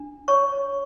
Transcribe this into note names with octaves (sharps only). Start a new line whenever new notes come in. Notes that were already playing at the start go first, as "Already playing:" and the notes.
Already playing: D4
C#5 C#6